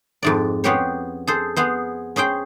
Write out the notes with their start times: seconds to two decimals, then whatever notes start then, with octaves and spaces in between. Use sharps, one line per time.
0.23 F2 G#2 D5
0.64 B3 C#4 G4 G#4 C5 C#5
1.27 G#4 A4 C5
1.56 B3 G#4 C5
2.16 C#4 G#4 C5 G5